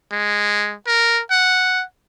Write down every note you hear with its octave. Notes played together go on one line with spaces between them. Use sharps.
G#3
A#4
F#5